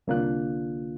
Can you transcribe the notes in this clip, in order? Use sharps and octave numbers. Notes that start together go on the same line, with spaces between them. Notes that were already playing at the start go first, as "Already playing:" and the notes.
C2 D3 A#3 D4 F4 F#6